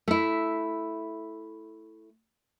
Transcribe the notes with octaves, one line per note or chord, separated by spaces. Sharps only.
A3 E4